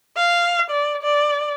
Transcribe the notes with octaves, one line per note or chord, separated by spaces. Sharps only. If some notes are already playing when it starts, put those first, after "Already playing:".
F5
D5
D5